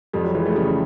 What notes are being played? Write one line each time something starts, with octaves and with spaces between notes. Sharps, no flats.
F2 G3
F#3
E3 G#3
A3
C#3 G3